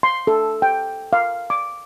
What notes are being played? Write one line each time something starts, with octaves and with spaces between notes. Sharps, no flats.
C6
A4
G5
F5
D6